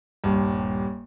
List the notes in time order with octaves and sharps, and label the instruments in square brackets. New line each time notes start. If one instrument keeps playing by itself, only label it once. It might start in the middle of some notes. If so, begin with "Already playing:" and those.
[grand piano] D#1 G2